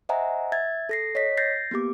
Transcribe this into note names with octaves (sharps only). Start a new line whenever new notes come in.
C5 D#5 E5 F#5 G#5 A#5
E5 G#6 A6
A4 A#6 C7
C#5 D#5 B6
G6 A6 A#6 C7
A#3 B3 G4 D6